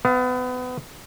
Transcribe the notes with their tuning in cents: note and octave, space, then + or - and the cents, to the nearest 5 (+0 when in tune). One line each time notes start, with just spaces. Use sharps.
B3 +30 F5 +0